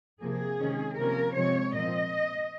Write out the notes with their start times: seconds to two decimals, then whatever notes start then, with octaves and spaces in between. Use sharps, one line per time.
0.20 C3 F3 A#3 G#4
0.60 C3 D#3 G#3 C#4
0.97 C3 F3 A#3 C#4 A#4
1.35 C3 F3 G#3 C4 C#5
1.74 A#2 F3 C4 D#5